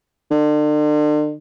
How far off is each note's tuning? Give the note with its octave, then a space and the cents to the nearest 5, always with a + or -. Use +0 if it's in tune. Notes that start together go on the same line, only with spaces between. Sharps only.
D3 +40